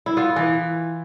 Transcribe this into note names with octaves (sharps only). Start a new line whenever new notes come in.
E4
B3 F4
E3